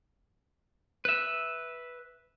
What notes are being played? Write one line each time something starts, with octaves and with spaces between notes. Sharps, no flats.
B4 E5